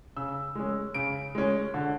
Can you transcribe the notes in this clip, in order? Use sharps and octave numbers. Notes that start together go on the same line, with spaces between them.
C#3 E6
G#3 C#4
C#3 D7
G#3 C#4
D3